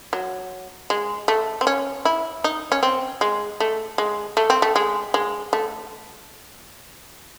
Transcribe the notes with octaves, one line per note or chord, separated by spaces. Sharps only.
F#3
G#3
A3
C4
C#4
E4
D#4
C#4
C4
G#3
A3
G#3
A3
C4
A3
G#3
G#3
A3